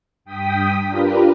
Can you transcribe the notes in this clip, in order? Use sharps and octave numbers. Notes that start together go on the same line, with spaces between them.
G2 G5 D#6 B6
D4 F4 G4 A#4 B4